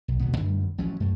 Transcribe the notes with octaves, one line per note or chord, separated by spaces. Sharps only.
B1
D1 B2 B3
F#2 D3 G3 A3
A1 F3 F#3 C#4
F#2 A3